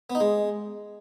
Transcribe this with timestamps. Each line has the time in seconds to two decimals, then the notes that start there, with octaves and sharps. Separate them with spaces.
0.10 B3
0.15 D#4
0.20 G#3